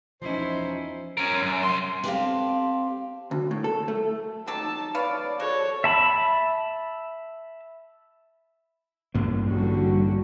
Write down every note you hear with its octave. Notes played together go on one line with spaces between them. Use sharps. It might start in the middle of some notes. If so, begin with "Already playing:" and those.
E2 F3 C#4 D#4 E4 C5
C#4 A#4
F#2
C2 C6
C4 G4 A4 F5
D2
A2
A4
A3
F#3 D#4 G4 A4 A5
B4 C#5 D5 F5
F#4 A4 C#5
E5 A5 B5
A1 G2 A#3
D3 G3 F#4